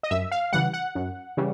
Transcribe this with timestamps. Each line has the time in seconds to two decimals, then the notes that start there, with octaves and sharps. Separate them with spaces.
0.03 D#5
0.11 F#2 E5
0.31 F5
0.53 C#3 E3 G3 F#5
0.73 F#5
0.95 F#2
1.37 C#3 E3 G3